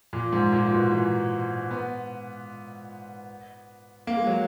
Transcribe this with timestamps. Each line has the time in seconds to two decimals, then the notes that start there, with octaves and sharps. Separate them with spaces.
0.13 A#2
0.32 G#2
0.53 A#2
0.71 B2
0.91 E3
1.71 B3
4.07 A#3
4.17 G#3
4.27 F#3